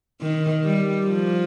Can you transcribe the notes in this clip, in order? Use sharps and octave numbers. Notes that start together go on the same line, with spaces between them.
D#3
G3
F3